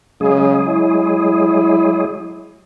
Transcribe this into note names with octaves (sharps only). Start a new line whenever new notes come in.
C#3 F#3 G#3 G#4
E4